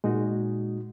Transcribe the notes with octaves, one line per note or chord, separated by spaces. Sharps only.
A#2 G#3 D#4 F#4